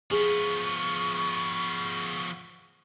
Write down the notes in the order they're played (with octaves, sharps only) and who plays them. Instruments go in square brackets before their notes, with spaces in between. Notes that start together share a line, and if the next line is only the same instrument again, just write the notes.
[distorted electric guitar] F3 B3 [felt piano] G#4 [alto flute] C#6